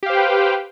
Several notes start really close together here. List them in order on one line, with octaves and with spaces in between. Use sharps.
G4 F5 C5 G5 B4